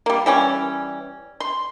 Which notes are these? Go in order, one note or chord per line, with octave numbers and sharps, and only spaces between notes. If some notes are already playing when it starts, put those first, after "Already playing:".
G3 A#3
E3 G3 C#4
C6